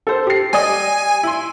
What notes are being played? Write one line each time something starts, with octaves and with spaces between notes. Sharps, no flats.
A4 C5
G4 C7
G3 D5 D#5 G#5
E4 C6